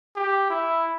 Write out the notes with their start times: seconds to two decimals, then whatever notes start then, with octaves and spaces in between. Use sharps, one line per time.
0.16 G4
0.50 E4